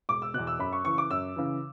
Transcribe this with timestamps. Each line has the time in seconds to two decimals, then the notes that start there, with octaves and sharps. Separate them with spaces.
0.09 E1 D6
0.22 E6
0.34 E2 B2 F#6
0.47 E6
0.59 F#2 B5
0.72 C#6
0.85 C#3 E3 C#6
0.98 D6
1.11 F#2 E6
1.36 C#3 E3